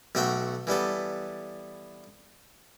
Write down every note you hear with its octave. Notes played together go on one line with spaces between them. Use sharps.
B1 A3 F#4 F#5 G5
E3 G3 B3 A4